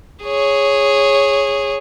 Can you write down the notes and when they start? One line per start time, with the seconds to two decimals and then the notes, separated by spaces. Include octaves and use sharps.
0.24 G#4 C#5